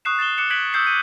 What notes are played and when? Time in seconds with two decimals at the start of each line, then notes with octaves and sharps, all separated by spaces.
0.05 C#6 D#6 F#6 C7 E7
0.19 A6 C7 E7 G7
0.38 D6 F#6 C#7 E7
0.50 F#6 G#6 B6 D7 F#7
0.73 D#6 E6 G6 C7 E7
0.87 D#7